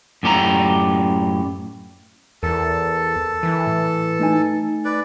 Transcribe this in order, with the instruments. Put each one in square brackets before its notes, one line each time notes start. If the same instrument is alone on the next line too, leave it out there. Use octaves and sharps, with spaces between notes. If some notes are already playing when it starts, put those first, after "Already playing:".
[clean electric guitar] F#2 A2 G4 A4 A#5
[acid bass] E2 [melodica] A4 [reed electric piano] A#4
[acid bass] E3
[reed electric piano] A2
A3 D#4 G#5
[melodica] B4 D5